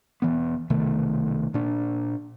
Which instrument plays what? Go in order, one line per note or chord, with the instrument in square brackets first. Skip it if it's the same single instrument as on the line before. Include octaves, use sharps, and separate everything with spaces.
[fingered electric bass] E1 E3 B3
B1 C3 D#3 A3
A#2 D4